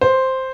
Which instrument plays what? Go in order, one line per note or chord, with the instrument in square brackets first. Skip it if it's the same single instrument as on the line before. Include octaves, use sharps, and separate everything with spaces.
[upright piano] C5